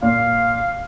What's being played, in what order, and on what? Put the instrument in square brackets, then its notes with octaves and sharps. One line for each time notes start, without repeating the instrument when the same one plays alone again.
[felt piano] A#2 [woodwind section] F5